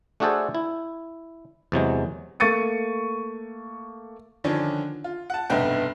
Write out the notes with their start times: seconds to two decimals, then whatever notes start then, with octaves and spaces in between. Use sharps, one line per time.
0.20 A3 D4 F#4 G#4 A4 C5
0.55 E4
1.72 E2 C3 F#3 G#3
2.40 A3 A#3 C#6 A6 C#7 D#7
4.44 D3 D#3 F3 C#4 D4
5.04 F4
5.30 F#5 A5
5.50 F1 B1 G2 A3 B3 G5